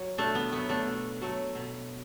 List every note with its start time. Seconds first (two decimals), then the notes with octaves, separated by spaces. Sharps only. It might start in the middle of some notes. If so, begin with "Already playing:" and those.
Already playing: F#3
0.18 B2 A3 D4
0.35 B3
0.52 F#3 A3 B3
0.69 A3 D4
0.87 B2
1.21 F#3 A3
1.55 B2